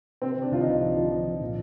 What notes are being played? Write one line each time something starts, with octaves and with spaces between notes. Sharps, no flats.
C3 C4
C3
D4
C2 F4
D#4
C2
F3
F3
F3
F3
A#2